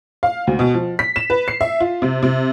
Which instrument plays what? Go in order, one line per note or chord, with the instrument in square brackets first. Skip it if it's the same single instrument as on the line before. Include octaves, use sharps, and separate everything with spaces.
[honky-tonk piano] F5
D2
B2
F3
B6
E7
B4
C7
E5
F4
C3
C3